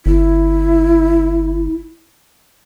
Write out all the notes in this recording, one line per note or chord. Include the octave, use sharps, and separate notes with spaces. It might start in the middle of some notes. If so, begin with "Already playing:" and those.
G1 E4